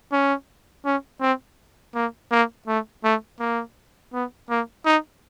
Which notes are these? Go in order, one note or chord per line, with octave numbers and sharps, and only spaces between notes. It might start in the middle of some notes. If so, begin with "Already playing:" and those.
C#4
C#4
C4
A#3
A#3
A3
A3
A#3
B3
A#3
D#4